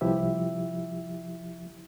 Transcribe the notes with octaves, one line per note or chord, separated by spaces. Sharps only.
C2 F3 E4 G4 E5